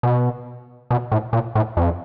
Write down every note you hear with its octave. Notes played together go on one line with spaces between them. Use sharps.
B2
B2
A2
A#2
A2
F2